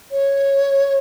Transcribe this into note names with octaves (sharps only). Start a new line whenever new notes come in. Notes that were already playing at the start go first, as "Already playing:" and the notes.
C#5